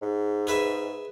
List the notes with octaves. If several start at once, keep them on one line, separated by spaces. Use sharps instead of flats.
G#2
G#4 B4 E5